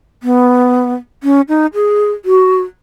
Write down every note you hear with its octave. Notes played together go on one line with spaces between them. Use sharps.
B3
C#4
D#4
G#4
F#4